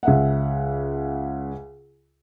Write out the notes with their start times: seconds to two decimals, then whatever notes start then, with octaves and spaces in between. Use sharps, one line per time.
0.03 C#2 E5 F#5